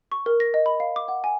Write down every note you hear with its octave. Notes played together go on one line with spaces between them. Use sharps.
C#6
A#4
A#6
D#5
B5
F5
D6
F#5
G#5